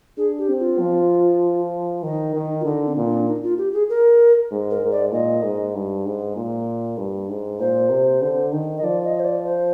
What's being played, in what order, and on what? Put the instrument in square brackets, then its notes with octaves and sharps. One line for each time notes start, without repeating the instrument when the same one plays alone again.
[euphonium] D4 [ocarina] G#4
[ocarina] G4
[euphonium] C4
[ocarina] F4
[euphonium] F3
[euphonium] D#3 [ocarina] D#4
[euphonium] D#3
[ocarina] F4
[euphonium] D3 [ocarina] D#4
[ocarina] C4
[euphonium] A#2
[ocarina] D4
D#4
F4
G4
G#4
A#4
[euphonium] G#2
[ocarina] A#4
[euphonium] G#2
[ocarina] D5
[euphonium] A#2 [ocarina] D#5
[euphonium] G#2
G2
G#2
A#2
G2
G#2
[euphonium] A#2 [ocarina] C5
[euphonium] C3
D3
D#3
[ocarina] D#5
[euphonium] F3 [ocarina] D5
[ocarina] D#5
C5
D5
C5